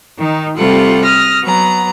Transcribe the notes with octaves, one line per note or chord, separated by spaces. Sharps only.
D#3 D#4
C3 G3 A3 F4 F#5
D#6 F6 A#6
F#3 B3 A#5